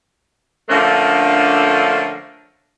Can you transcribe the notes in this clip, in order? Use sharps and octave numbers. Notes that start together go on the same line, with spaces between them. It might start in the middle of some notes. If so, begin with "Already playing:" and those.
D3 F3 A3 A#3 C#4 D4